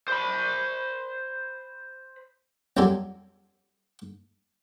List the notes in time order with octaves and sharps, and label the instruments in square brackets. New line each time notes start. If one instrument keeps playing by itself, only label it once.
[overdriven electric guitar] C5 B5
[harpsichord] C2 F2 F#3 G4 A4 G#5